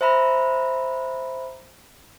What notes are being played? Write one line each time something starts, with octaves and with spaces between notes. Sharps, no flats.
C5 E5 A#5 B5